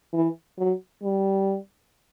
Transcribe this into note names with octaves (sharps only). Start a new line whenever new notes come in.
E3
F#3
G3